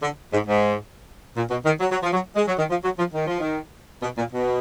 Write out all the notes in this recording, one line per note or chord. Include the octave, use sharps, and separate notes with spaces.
D3
G#2
G#2
A#2
B2
D#3
F#3
F#3
F3
F#3
G#3
F#3
D#3
F3
F#3
F3
D#3
F3
D#3
B2
A#2
B2